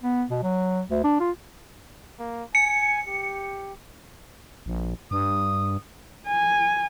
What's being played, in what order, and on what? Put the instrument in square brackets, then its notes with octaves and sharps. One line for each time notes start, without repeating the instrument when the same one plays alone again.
[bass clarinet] B3
B2
F#3
D2
D4
F4
[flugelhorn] A#3
[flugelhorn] G#5 [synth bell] C#7
[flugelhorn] G4
[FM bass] A#1
[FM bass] G2 [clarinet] D#6
[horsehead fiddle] G#5